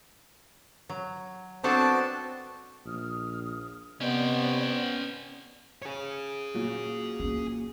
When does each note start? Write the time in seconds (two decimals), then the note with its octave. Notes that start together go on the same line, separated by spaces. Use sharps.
0.89 F#3
1.64 B3 C4 D4 F#4 A4 A5
2.86 A#1 D#6 F6
4.01 C3 B3 C#4 C5 D5 D#5 G5
5.82 G#4 C#5
6.54 A#2 F#3
7.20 A#3 C#4